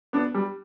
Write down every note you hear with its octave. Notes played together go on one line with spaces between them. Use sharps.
B3 D4
G3